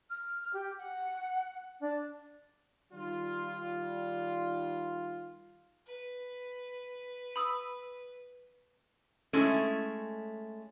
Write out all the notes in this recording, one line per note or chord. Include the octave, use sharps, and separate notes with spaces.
F6
G4
F#5
D4
D#3 G3 F4
B4
B5 D#6 E6
G#3 A3 C#4 E4